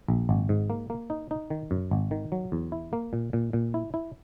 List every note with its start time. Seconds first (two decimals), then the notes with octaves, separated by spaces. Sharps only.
0.08 A#1
0.29 G#1
0.49 G#2
0.70 A#3
0.90 A#3
1.10 D#4
1.31 D#4
1.50 D#3
1.71 F#2
1.91 G#1
2.11 D#3
2.32 F#3
2.52 E2
2.72 E4
2.93 A#3
3.13 A#2
3.33 A#2
3.53 A#2
3.74 E4
3.94 E4